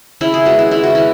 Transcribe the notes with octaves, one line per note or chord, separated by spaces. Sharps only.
C#3 E4
G#4
G#3 B3 F#4
E4
C#3 E4
F#4
G#3 B3 E4